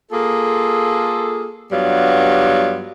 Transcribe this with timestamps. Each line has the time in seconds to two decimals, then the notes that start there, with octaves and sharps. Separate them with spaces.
0.11 A#3 F4 G#4 A4
1.72 G2 F#3 G3 B3 F4